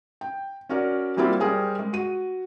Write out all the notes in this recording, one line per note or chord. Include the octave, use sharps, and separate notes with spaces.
G5
C#4 F#4 A#4 D5
F#3 G3 A#3 C4 E4 F4
G3 G4 G#4 A#4 C5
G#3
F#4 D#7